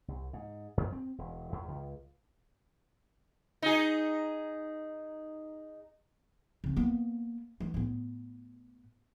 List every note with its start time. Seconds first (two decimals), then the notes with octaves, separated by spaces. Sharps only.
0.08 C2
0.33 G#2
0.77 F#2
0.93 C4
1.18 E1
1.52 E2
1.68 C#2
3.62 D#4 G#4
6.64 C#3 C4
6.77 A#3 B3
7.60 E3 A3
7.74 A2 B3